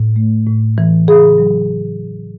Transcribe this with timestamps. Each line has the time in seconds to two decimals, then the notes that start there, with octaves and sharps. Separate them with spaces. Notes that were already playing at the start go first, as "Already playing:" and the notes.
Already playing: A2
0.16 A3
0.47 A2
0.78 E3
1.08 C#3 G#4
1.38 F#3